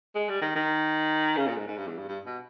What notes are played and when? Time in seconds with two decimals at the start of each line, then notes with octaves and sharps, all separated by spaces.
0.15 G#3
0.29 G3
0.41 D#3
0.55 D#3
1.37 C#3
1.47 A#2
1.57 G#2
1.67 G#2
1.77 G2
1.87 E2
1.98 G2
2.08 G2
2.26 B2